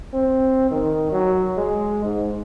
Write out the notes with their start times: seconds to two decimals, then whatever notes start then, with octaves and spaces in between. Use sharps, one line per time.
0.13 C4
0.71 D#3
1.12 F#3
1.57 G#3
2.04 G#2